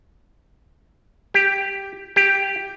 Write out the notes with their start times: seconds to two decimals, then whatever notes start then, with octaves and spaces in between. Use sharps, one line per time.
1.34 G4
2.16 G4